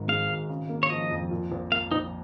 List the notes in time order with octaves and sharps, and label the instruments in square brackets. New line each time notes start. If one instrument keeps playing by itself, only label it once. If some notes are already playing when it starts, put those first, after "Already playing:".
Already playing: [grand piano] G#1 G#2
[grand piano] G#3 [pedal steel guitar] F5
[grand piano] G#1
C#3
A#3
[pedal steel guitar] C#5
[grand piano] F3 [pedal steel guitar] D#5
[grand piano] F2
A#2
A#1
[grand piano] A#3 [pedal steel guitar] F5
[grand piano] A#1 [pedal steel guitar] D#4